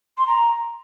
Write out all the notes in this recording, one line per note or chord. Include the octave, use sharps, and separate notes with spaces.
C6
A#5